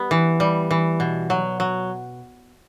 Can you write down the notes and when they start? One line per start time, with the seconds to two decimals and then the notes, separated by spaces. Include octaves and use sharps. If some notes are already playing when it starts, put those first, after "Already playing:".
Already playing: G3 B3
0.11 E3
0.40 G3
0.71 E3
1.00 B2
1.30 F#3
1.60 F#3